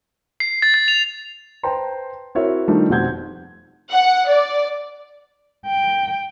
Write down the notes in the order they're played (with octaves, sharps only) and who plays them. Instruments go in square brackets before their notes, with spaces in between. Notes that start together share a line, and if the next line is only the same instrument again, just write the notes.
[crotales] C7
A6
A6
F7
[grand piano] B4 C5 G5 A5 A#5 C6
C4 E4 F#4 A#4 C#5 E5
D#3 F3 G3 A3 D4 D#4
F1 B2 C4 F#5 G6 G#6
[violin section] F#5
D5
[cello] G5